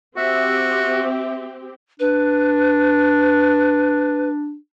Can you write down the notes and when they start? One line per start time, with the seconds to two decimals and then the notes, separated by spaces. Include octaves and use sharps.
0.17 C4 F#4 G4 E5
2.00 D4 B4